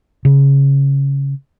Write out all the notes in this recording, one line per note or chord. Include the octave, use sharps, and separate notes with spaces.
C#3